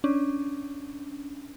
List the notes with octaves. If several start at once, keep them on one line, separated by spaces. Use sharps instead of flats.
C#4 D4